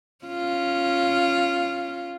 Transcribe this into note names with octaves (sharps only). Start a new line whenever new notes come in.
C#4 F4